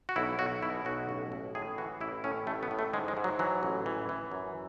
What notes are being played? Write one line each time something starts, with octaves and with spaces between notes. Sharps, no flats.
F#4
B1 E4
B1 F#4
B2 E4
B1 F#4
A1
A1
A2 G#4
E3 F#4
A1 E4
A2 C#4
A1 A3
B3
A2
A3
G#2 G#3
G#3
G#2
F#3
E3 F#3
A1
E3
E3
F#2